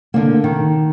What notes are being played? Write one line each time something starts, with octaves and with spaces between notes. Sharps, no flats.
D3 A#3
D#3